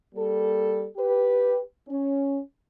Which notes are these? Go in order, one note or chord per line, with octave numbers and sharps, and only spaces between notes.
G3 A#3 A4
G4 B4
C#4